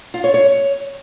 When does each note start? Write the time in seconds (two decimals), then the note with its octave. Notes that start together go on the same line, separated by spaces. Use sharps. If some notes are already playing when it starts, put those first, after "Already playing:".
0.14 F4
0.24 C#5
0.34 C#5